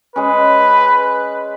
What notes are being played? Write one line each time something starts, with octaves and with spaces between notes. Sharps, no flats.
G#3 C#4 B4